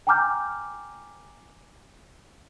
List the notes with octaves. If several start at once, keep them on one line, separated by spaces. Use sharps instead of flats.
G5 G#5 A#5 D6 F6 G6